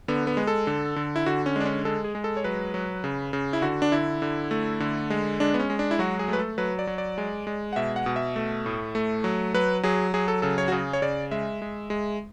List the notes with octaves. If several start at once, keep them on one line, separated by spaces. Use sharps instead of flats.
D3 B3
B3
G#3
A4
D3
D3
E4
D3 F#4
C#4
G#3 D4
C#4
G#3 A4
G#4
G#3
A4
C#5
F#3 B4
F#3
C#3
C#3
E4
D3 F#4
D4
D3 E4
D3
A3
D3
G#3
G#3 D4
B3
C#4
G#3
D4
E4
F#3 F#4
G#4
A3 B4
A4
F#3 B4
D5
F#3
D5
G#3
G#3
F#5
B2 E5
F#5
B2
E5
A3
A2
A3
F#3
F#3 B4
F#3 G#4
F#3 G#4
A4
C#3 A4
C#5
F#4
C#3 G#4
C#5
C#3 D5
G#3 E5
G#3
G#3